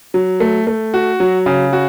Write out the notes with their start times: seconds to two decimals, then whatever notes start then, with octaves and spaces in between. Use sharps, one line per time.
0.14 F#3
0.40 A3
0.67 A3
0.94 F#4
1.20 F#3
1.46 C#3
1.73 F#4